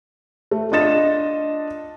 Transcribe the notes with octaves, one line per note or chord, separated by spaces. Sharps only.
A3
D4 F4 D#5 A6 E7